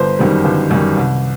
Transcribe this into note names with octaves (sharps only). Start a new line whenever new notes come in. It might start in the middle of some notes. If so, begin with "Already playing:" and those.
Already playing: G1 C5
F#2 D#3 G3
G1
F#2 D#3 G3
C2